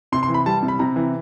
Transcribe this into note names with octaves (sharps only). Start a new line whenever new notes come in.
C3 C6
C6
E3
B5
G3 A5
C3
B5
C3 A#5
E3